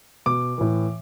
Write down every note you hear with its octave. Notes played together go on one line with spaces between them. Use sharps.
B2 D6
A2 E3